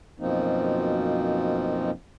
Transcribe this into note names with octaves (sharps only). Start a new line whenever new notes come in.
F#2 B2 F3 A#3 C4 D#4